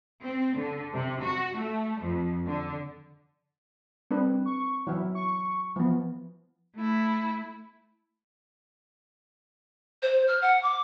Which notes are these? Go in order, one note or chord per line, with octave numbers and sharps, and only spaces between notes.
C4
D3
C3
F#4
A3
F2
D3
G3 C4 D4 B4
C#6
E3 F#3 E4
C#6
E3 F3 B3
A3 E4
C5
F6
F#5
D6